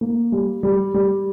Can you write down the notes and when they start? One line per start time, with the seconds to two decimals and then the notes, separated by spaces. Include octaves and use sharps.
0.01 A#3
0.32 G3
0.63 G3
0.94 G3